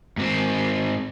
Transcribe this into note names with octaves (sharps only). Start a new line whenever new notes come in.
G#2 C4